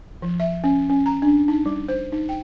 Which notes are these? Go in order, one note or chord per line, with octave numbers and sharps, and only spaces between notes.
F3
E5
C#4
C#4
A#5
D4
D#4
G3
C5
D#4
G5